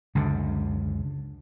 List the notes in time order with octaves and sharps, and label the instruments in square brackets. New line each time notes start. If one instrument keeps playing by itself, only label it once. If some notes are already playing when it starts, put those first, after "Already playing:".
[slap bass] C#2 F#2 D3